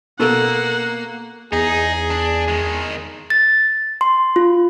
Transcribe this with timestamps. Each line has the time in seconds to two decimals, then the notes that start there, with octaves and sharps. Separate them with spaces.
0.19 B2 A#3 A4 F#5
1.53 E2 D#4 G#4
2.11 D4
2.48 D#3 G#3
3.30 A6
4.01 C6
4.36 F4